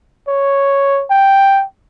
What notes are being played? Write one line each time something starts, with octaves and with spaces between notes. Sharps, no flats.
C#5
G5